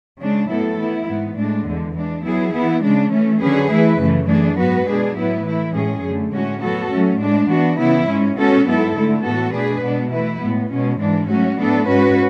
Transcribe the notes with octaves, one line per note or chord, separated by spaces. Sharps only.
C#3 G#3 D4
A2 F#3 B3 E4 A4
E3 B3 E4
G#2 E3 B3
A2 G#3 D4
E2 D3 G#3
E3 G#3 D4
F#3 B3 E4 G#4
E3 B3 E4
C#3 G#3 D4
E3 A3 C#4
D3 F#3 C#4 G#4 B4
E3 A3 E4 B4
F#2 C#3 E3 A3
E3 A3 D4 G#4
G#2 F#3 B3 F#4 B4
B2 G#3 D4 G#4
A2 F#3 B3 E4 B4
E3 A3 E4
A2 G#3 C#4 G#4
F#2 D3 A3
A2 G#3 C#4 F#4
F#3 B3 F#4 A4
F#3 A3 C#4
A2 G#3 D4
E3 B3 D4 F#4
C#3 E3 B3 E4
G#2 G#3 C#4
B2 G#3 C#4 F#4 A4
G#2 F#3 B3 E4 A4
D3 A3 E4
A2 E3 B3 F#4 A4
B2 A3 D4 G#4 B4
B2 G#3 B3 D4
E3 A3 E4 B4
A2 G#3 B3
B2 G#3 C#4
G#2 E3 G#3 D4
F#3 A3 C#4 F#4
A2 F#3 B3 D4 A4
G#2 G#3 C#4 F#4 B4